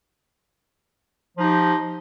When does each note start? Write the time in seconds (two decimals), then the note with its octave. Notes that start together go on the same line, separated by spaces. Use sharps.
1.37 F3
1.40 D#4
1.44 G4